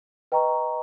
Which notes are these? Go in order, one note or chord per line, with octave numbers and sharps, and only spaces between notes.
B4 D#5 G5 A#5 C#6